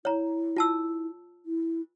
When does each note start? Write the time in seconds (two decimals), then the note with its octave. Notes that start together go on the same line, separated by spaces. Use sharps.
0.05 E4 C#5 A#5
0.56 F4 A5 E6
1.46 E4